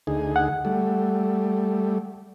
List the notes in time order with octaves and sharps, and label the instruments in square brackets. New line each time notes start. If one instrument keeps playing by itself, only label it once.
[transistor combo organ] D2 D#4 G#4
[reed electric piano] F#5
[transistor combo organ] G3 A3